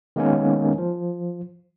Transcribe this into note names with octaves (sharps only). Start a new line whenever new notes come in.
D#3 G#3 A#3 B3 C#4 D#4
F3